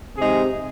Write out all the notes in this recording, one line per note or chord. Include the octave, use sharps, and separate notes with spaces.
C3 G#3 D#4 G#4